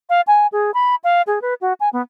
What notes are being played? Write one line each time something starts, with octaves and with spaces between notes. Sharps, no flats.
F5
G#5
G#4
B5
F5
G#4
B4
F#4
G#5
B3